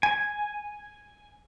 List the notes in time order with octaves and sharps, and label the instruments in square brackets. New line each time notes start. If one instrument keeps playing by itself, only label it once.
[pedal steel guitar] G#5